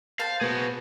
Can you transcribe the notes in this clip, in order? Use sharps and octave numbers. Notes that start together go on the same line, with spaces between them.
C5 F5 G5 A5
B2 B3 F#4 G#4